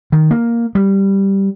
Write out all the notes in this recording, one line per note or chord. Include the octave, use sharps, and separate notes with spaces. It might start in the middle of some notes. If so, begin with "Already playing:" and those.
D#3
A#3
G3